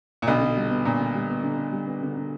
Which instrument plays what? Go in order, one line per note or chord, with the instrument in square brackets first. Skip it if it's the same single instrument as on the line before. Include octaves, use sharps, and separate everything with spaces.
[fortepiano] A#2
[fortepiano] B1 B2 [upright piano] D3
[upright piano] D3
G3
B3
[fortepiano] A#2 [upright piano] D3
[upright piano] D3
G3
B3
D3
D3
G3
B3
D3
D3